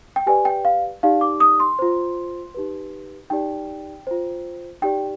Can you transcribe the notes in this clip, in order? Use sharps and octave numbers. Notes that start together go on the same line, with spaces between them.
G5
G4 B4 D5 G#5
G5
F5
D#4 G4 D5 F5
D6
D#6
C6
F4 C5
D#4 G4 B4
D#4 G4 D5 G5
F4 C5
D#4 G4 D5 G5